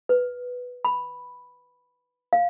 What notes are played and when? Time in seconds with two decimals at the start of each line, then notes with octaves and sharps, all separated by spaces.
0.09 B4
0.85 B5
2.33 F5